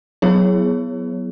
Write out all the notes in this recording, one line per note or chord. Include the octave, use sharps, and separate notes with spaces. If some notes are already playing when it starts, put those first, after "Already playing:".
F#3 B3 E4 G#4 C#5